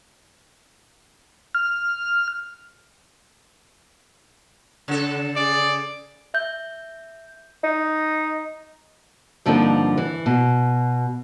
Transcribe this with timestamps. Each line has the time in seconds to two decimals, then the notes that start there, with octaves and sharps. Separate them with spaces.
1.55 F6
4.88 C#3 A4
5.37 G#4 D5
6.34 E5 G6
7.64 D#4
9.46 G2 D3 F3 A#3 C4 D#4
9.97 E3
10.26 B2